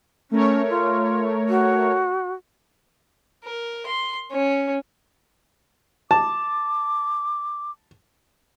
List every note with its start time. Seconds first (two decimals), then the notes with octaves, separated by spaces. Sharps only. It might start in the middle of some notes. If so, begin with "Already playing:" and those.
0.31 A3 C#4 A#4 C#5
0.70 F4
1.49 F#4
3.44 A#4
3.86 C6
4.32 C#4
6.11 A5 D6